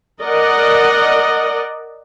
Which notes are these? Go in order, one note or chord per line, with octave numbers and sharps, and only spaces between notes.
A#4 D5 D#5 F#5